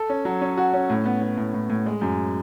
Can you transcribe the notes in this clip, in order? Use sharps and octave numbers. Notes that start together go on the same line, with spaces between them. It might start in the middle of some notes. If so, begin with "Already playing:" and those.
Already playing: A4
C#4
F#3
C#4
F#4
C#4
A2
B3
B3
A2
A2
A2
G#3
F#2